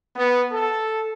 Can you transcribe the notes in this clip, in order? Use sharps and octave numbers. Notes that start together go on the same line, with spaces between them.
B3
A4